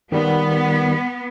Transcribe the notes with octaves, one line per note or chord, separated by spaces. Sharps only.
D#3 G3 B3